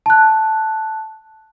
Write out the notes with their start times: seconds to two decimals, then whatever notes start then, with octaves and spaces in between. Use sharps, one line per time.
0.06 A5 F#6